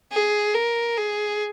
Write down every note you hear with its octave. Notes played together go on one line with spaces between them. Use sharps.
G#4
A#4
G#4